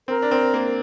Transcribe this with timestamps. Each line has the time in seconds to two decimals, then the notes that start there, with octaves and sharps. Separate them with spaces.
0.08 C4 A#4
0.22 D4
0.31 C4
0.54 A#3